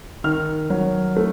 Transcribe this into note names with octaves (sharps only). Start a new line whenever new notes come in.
D#3 F6
F#3
A3